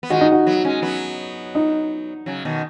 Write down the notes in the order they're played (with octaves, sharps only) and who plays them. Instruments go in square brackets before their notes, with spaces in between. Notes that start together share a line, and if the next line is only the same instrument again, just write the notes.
[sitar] B3
[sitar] D#3 G#3 [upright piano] F#4
[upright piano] D#4
F#4
[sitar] F#3 B3
B3
G#3 C#4
F#3 B3
[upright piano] D#4
[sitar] C#3 F#3
B2 D#3